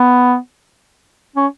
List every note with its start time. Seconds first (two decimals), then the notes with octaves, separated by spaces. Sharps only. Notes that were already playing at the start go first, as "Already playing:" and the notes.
Already playing: B3
1.36 C#4